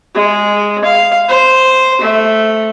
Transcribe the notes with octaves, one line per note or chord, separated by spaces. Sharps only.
G#3
F5
C5
A3